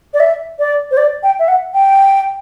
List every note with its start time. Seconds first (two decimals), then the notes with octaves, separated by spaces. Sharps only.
0.14 D5
0.20 E5
0.59 D5
0.91 C5
0.97 D5
1.23 G5
1.39 E5
1.48 F#5
1.74 G5